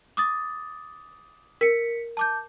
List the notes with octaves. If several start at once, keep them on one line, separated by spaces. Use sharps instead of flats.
D6 D#6 A6
A#4 B6 C#7
A5 D6 G6